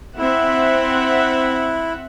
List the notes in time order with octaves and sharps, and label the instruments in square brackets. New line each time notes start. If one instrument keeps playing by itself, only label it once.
[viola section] C4 E5 F#5 [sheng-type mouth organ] E4